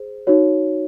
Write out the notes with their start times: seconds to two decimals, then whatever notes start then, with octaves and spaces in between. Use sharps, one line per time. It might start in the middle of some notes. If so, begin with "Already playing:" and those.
Already playing: G#4 C5
0.27 D#4 F#4 C#5